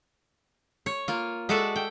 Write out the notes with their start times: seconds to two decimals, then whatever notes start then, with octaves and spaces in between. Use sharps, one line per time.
0.86 C#5
1.08 A#3 F4
1.49 G#3 F#4 A4 D5 E5
1.76 G5